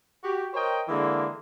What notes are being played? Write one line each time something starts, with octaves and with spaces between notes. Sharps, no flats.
F#4 G4
A#4 C5 C#5 D#5 G5
D3 E3 G#3 A#3